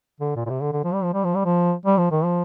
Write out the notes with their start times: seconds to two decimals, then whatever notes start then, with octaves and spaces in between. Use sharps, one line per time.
0.20 D3
0.36 A#2
0.46 A#2
0.50 C3
0.61 D3
0.72 D3
0.84 F3
0.94 G3
1.04 F3
1.14 G3
1.24 F3
1.35 G3
1.45 F3
1.86 G3
1.98 F3
2.11 D#3
2.25 F3